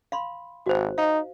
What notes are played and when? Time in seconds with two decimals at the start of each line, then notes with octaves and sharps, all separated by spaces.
0.12 F5 B5 C6
0.66 G#1 F#4 C5
0.98 D#4 F5